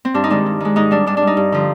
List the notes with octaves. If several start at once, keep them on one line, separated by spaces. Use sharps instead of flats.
C4
G2 D4
D#4
D#3 G#3 D4
G2
D#3 G#3
G#2 D#4
G3 D4
G#2 D4
D4
G3
D#4
G2
D3 F3